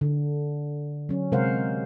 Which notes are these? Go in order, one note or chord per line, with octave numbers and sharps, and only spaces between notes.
D3
F#3 C#4
C3 G#3 A#4 C5 F5 F#5